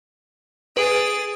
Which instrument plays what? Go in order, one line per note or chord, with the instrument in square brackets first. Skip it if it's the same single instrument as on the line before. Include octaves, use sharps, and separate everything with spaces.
[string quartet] G#4 A6 [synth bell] B4 D7